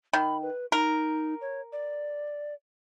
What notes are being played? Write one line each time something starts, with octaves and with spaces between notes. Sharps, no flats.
D#3 B5
B4
D#4 A#4
C#5
D5